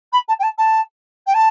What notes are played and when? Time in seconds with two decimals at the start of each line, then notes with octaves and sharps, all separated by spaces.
0.12 B5
0.28 A5
0.39 G5
0.43 A5
0.58 A5
1.26 G5
1.34 A5